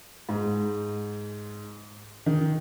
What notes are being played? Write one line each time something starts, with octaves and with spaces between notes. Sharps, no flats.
G#2
D#3